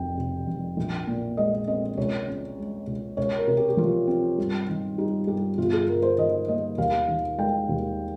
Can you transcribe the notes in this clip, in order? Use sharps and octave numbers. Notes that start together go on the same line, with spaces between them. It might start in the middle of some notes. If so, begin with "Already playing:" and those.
Already playing: F1 F2 G5
C3
F1
A#1
A#2
G#3 D#5
C4 D#5
C#2 C#5
C#3
G#3
C#2
C#2 C#5
A#4
C3
G4
G4
F3 F4
C4
G2
D#3
G3 D#4
G2 G4
G1 F4
G#4
G2 A#4
C5
D#3 D#5
A#3 D#5
D#2 F5
D#3
G#3 G5
D#2